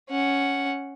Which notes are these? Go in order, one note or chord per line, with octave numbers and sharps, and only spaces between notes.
C#4 F#5